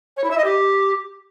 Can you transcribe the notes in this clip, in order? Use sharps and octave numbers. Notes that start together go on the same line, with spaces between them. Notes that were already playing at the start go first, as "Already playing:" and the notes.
C#5
E4
E5
D#5
G4